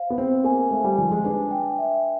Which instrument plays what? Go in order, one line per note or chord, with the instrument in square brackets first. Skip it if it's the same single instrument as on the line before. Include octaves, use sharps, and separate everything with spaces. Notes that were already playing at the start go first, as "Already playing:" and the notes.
Already playing: [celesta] C5 F5
[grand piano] B3
[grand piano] C4 [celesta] C5
[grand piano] A#3 [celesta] G#5
[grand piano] A3 [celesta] C5
[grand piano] G3
[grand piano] F3 [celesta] G#5
[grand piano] G#3
[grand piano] D4 [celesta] B4
[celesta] G5
E5